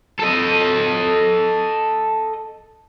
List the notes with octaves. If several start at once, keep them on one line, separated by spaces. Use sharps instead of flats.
A4 D#5